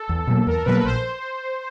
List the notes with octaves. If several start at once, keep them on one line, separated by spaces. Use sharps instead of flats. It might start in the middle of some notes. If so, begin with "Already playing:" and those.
Already playing: A4
E2
B2 F#3 A#3
E2 A#4
B2 F#3 A#3 B4
A#1 C5